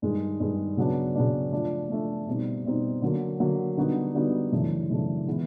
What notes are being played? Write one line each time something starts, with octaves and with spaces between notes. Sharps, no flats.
G2 D#3 G#3
G2 D#3 G#3
C#3 F#3 B3 D4
C#3 F#3 B3 D4
F3 A3 D4
F3 A3 D4
B2 G3 C4 D#4
B2 G3 C4 D#4
D3 F#3 A#3
D3 F#3 A#3
D3 G3 B3 D#4 F#4
D3 G3 B3 D#4 F#4
F#2 C#3 E3 A3 D4
F#2 C#3 E3 A3 D4
E3 G#3 B3 E4